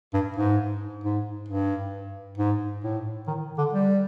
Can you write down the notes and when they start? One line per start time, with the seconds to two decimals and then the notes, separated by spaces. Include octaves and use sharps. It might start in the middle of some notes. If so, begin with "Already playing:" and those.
0.14 G2
0.37 G#2
1.04 G#2
1.48 G2
2.38 G#2
2.84 A2
3.27 D#3
3.58 D3
3.73 G3